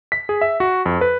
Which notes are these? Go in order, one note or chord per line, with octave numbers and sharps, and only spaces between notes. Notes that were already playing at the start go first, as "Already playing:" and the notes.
B6
G#4
E5
F#4
F2
B4